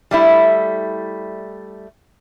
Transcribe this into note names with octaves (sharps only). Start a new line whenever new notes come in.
G3 A3 E4